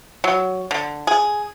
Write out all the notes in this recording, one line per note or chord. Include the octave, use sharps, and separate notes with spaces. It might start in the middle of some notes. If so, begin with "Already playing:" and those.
F#3
D3
G#4